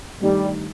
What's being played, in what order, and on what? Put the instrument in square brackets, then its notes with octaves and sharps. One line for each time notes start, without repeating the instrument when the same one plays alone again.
[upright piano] G2 D#3 A3 D#4 [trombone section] G3